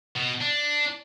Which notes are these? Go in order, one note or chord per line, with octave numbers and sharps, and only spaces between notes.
B2
D4